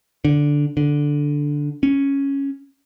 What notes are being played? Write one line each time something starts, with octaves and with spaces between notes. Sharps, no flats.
D3
D3
C#4